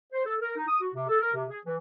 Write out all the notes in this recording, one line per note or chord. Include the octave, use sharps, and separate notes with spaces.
C5
A4
A#4
D#4
D#6
F#4
C3
A4
A#4
C3
G#4
E3